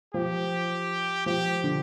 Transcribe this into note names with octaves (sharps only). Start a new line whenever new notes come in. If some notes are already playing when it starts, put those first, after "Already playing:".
F3 G4
F3 G4
D3